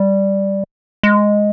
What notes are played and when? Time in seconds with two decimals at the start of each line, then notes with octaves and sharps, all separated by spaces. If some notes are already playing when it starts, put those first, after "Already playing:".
Already playing: G3
1.03 G#3